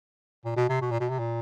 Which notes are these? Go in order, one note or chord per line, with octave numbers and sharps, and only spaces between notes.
A#2
B2
C3
B2
A#2
B2
C3
A#2